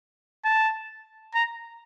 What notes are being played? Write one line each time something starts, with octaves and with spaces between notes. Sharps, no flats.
A5
A#5